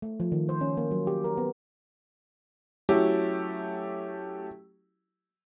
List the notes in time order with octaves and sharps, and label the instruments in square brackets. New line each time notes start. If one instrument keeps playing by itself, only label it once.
[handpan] A3
F3
D#3
C5
C#4
A#3
F#3
G4
A#4
B3
[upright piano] F#3 A3 C#4 E4 G4